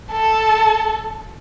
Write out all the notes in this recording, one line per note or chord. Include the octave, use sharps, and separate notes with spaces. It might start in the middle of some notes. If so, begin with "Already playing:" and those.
A4